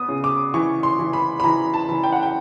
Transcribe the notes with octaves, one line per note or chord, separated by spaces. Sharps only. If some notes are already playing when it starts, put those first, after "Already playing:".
Already playing: B3 D#6
C#3
D6
E3 C#6
C6
E3
B5
B5
E3 A#5
A5
E3
G5
F#5
G5